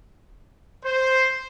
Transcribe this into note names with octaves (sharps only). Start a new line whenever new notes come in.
C5